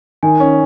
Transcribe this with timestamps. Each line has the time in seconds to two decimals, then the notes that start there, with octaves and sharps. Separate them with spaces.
0.23 D#3 G#5
0.40 C#4